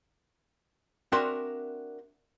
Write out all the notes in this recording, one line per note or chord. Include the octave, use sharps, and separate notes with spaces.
C4 D4 F#4 A#4 E5 C6